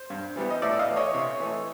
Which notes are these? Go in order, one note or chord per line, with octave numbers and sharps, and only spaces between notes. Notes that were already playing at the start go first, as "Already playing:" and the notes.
Already playing: C5
G2
E3 G3 B3
D#5
A2 D5 E5
D#5 F5
E3 A3
C#5 D#5
C3
E3 A3